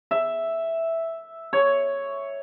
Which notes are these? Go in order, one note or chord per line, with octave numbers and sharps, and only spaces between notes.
E5
C#5